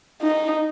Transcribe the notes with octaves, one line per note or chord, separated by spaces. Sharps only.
D#4